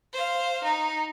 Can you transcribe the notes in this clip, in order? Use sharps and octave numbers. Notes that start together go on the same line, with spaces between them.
C5 F5
D#4